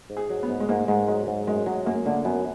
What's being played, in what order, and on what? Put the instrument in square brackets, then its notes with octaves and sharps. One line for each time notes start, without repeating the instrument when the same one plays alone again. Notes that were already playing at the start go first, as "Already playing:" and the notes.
[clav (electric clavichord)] G#2
[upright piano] G#4
[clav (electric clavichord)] F#3
[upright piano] B3
[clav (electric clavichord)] G#2
[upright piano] G#3
[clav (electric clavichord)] G#2 [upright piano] A#3
[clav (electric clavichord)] G#2 [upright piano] G#3
[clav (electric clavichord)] F#3 [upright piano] G#3
[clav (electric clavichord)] G#2
[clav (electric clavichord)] F#2 [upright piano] G#3
[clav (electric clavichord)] F#3 [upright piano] G#3
[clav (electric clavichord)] F#2 [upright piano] A#3
[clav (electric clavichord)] D3 [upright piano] A#3
[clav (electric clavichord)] F#2 [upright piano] B3